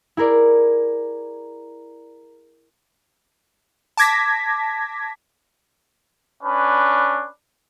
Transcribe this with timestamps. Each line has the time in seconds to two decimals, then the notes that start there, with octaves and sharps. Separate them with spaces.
0.17 E4 G#4 A#4 D5
3.97 A5 D6 G#6 A#6 B6
6.44 C#4 D4 B4